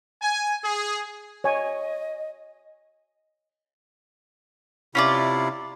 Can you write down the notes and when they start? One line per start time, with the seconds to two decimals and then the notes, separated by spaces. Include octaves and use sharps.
0.22 G#5
0.63 G#4
1.44 C#5 D#5 G#5
4.95 C3 C#4 E4 F4 D5